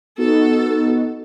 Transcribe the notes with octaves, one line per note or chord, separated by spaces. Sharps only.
B3 D#4 F#4 A4